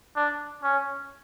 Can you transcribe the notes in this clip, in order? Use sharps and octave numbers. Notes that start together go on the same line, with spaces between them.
D4
C#4